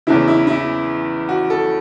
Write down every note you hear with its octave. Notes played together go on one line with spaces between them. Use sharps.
E2 C#3 E3 E4
E4
E4
F#4
A4